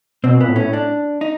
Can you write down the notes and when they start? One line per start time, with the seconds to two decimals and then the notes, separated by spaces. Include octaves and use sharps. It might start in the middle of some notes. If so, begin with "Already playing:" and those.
0.23 B2 C4
0.38 A#2 B3
0.48 A2
0.56 C#4
0.73 D4
1.21 D#4